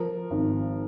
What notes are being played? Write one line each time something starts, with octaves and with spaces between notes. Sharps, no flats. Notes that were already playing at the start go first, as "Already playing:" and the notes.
Already playing: F3 A#4
G#1